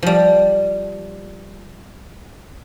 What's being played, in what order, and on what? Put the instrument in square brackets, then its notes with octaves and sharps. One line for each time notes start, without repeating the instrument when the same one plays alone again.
[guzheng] F3 G3